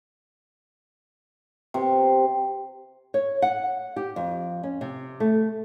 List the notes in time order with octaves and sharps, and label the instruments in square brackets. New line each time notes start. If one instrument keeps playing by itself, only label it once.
[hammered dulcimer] C3
[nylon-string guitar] C#5
F#5
G4
F2
C#4
C3
A3